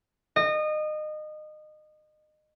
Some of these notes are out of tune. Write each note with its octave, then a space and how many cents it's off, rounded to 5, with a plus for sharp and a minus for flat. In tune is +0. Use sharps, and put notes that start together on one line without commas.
D#5 -25